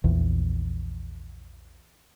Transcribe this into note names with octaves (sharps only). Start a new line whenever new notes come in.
A#1 E2